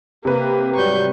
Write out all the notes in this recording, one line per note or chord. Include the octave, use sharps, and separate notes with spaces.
C3 A#3 G4 B4
G#2 F#3 G3 C#6 G6